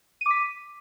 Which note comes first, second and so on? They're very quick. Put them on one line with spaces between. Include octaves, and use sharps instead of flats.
D#7 D6 B6